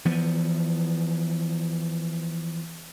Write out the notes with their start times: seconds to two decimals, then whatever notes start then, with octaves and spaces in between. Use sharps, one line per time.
0.05 E3 F3 B3